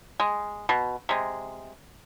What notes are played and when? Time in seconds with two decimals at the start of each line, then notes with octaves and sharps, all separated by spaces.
0.20 G#3
0.69 B2
1.09 C3 G#3